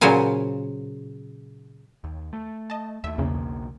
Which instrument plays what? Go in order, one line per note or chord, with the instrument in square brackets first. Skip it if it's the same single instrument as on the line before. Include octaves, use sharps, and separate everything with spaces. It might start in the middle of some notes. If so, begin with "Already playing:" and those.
[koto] A#2 C#3 F#3 C5 F5 G#5
[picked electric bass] D#2
A3
[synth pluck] D#5 A5
[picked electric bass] D#2 A3 [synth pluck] E5
[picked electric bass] B1 A#3 [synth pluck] E2 C#3